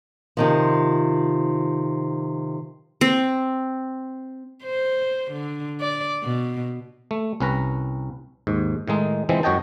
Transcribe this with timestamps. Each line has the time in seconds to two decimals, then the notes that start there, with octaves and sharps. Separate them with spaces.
0.37 C3 D#3 F3
3.01 C4
4.64 C5
5.31 D3
5.81 D5
6.23 B2
7.11 A3
7.40 C2 C#4 B4 A#5
8.47 D#2 G#2
8.88 A2 D#3 G#3 D#4
9.29 E3 F3 G#3 C4
9.43 F#2 F#4 C#5 D#5 G5 A5